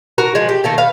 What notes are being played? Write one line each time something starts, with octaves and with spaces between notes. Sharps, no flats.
F#4 A#4 A#5
F3 G#3
G4
D#3 A3 A#3
B4 F5